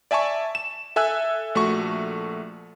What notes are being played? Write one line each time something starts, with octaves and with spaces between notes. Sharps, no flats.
D5 E5 G#5 A5 C#6
E7
A4 E5 G#5 E6 F#6
A#1 A3 F#4 C#6